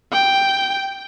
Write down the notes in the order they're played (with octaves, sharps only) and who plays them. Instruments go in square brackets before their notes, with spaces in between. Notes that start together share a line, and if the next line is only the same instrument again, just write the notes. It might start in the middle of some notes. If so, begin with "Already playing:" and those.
[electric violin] G5